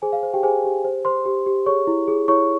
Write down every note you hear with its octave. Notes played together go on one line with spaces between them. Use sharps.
G#4 C5 G#5
F5
C5
G4 G5
G#4 C5 G#5
G4
C5
C5 C6
G4
G4
G#4 C#5 C#6
E4
G#4
E4 C#5 C#6